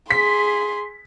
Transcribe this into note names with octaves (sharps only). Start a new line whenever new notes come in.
G#4 C6 B6